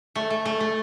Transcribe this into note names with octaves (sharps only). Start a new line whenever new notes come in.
A3
A3
A3
A3